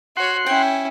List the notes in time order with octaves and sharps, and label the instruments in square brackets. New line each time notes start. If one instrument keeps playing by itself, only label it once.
[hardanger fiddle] F#4 C#5 [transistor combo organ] F#5 C6
[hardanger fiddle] C#4 E4 [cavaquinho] G5